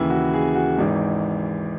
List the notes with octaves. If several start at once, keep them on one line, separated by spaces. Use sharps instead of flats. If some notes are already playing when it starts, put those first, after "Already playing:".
Already playing: D#2 C#3 E3 E4
F#4
G#4
F#4
G#1 G#2 E3 D#4